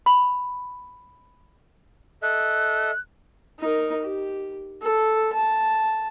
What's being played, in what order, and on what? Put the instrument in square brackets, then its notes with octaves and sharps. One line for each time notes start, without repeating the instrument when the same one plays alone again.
[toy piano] B5
[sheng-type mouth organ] A4 D#5 E5 [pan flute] F#6
[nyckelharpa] D#4 A#4
G4
A4
A5